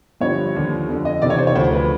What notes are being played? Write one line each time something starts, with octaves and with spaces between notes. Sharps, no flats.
G2 D3 F3 C#5
D#2 D3 F3
F2 D3 F3
D#5
E2 C3 D#3 D5
C#5
C5
C#5
D2 C#3 F3 C5
B4